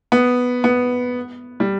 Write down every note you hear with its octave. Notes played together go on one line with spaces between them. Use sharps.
B3
B3
G3